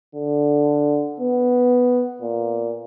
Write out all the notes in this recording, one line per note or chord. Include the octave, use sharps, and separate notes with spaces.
D3
B3
A#2